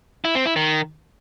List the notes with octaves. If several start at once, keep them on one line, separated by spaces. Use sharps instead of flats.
E4
C4
E4
D#3